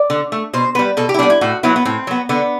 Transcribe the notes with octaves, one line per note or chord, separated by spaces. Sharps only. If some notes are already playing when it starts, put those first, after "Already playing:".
Already playing: D5
D3
A3
B2 C5
G3 B3 B4
B2 A4
G4
E4
G3 B3 D4
E4
A2 F#4
F#3 B3 E4
B3
A2 C4
F#3 B3
D3 B3